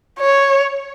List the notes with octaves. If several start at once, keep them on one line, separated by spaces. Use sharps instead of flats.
C#5